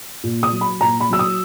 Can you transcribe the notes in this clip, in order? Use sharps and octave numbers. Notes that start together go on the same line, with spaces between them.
A#2
D#6
F#3
B5
A#2 A#5
B5
F#3 E6
D#6